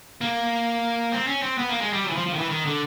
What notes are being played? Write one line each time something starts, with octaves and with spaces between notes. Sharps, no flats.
A#3
C4
C#4
C4
B3
A#3
G#3
G3
F#3
E3
F3
F3
D#3
E3
D#3
D3